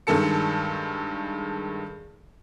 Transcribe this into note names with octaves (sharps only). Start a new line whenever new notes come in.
G2 D#3 G#3 A4 A5 C#7